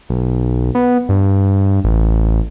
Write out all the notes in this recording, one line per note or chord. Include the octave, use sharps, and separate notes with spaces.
B1
B3
G2
A1